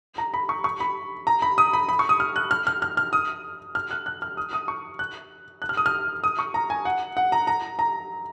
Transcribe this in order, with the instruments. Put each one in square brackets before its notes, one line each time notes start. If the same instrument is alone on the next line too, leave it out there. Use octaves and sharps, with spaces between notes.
[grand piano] A#5
B5
C#6
C#6
B5
A#5
B5
D#6
B5
B5
C#6
D#6
F6
F#6
F6
F6
F6
F6
D#6
F6
F#6
F#6
F6
D#6
D#6
C#6
F#6
F#6
F6
D#6
F6
D#6
C#6
A#5
G#5
F#5
F#5
A#5
A#5
A#5